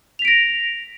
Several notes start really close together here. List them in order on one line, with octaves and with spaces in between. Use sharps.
F7 B6 D7 A#6